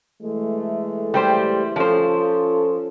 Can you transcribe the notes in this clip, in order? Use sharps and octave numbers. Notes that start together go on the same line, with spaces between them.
E3 G#3 A3
G3 G4 C5
F3 C#4 F4 A4 C5